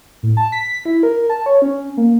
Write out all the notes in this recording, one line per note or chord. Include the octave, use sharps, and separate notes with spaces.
A2
A5
B6
E4
A#4
A5
C#5
C#4
A#3